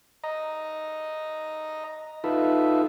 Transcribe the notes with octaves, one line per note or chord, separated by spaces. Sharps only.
D#5 A#5
D#4 F4 A4 B4 E5